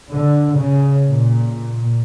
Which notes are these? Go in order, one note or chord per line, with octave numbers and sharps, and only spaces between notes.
D3
C#3
A#2